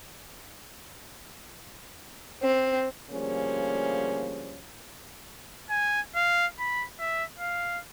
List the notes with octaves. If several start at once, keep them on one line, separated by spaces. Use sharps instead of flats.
C4
D2 F3 G3 A#3 C#4 G#4
G#5
F5
B5
E5
F5